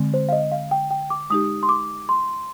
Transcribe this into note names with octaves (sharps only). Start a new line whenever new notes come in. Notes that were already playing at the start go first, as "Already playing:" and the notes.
Already playing: D3 G#3 C4
C5
F5
D#5
F5
G5
G5
D6
G#3 D#4 G4 D#6
C6
D6
C6